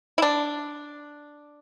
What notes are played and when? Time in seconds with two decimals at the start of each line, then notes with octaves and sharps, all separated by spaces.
0.18 E4
0.22 D4